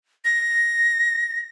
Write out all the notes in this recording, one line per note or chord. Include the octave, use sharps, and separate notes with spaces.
A#6